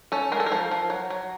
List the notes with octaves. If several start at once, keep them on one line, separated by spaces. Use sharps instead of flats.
C#4 A4
G#3 A#4
A4
A#4
F3
F3
F#3
F#3